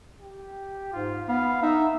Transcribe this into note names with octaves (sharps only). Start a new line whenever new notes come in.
G4
G#2 F4
B3 F5
D#4 E5